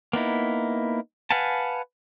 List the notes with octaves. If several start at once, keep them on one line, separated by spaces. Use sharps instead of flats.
A#3 B3 D#4 E4
B4 F5 F#5 G#5 A5